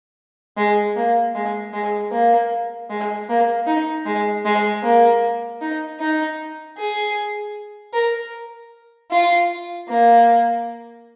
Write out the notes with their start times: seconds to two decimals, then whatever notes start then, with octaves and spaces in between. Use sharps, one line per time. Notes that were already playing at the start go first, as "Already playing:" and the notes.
0.57 G#3
0.96 A#3
1.35 G#3
1.73 G#3
2.12 A#3
2.90 G#3
3.29 A#3
3.67 D#4
4.06 G#3
4.45 G#3
4.83 A#3
5.61 D#4
6.00 D#4
6.78 G#4
7.93 A#4
9.11 F4
9.88 A#3